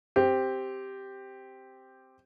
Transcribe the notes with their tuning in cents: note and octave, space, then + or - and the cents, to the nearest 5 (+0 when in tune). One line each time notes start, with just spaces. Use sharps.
C4 +0 G4 +0